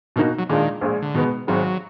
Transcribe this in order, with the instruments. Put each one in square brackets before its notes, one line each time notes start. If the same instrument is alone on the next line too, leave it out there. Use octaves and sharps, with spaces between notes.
[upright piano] B2 A#3 D#4 F#4 [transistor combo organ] D#3
[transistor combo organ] F#3
[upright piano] A#2 G#3 D4 F4 [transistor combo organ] D#3
[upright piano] A#1 A#2 G#3
[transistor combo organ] D3
[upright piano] B2 G#3 B3 [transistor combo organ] D#3
[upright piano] G#1 G#2 D#3 G#3 [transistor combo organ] F#3